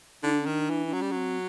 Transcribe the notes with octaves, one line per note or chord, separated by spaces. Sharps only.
D3 D#4
D4
C#4
D#3 D4
E3
D4
F#3 C#4
G3
F#3 C4